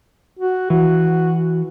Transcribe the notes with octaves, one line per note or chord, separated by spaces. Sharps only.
F#4
E3 F#4